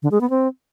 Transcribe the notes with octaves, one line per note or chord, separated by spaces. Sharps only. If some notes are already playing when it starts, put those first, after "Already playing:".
D3
G#3
B3
C4